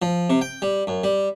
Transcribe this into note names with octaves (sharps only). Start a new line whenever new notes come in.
F3
C3
G5
G3
F#2
G3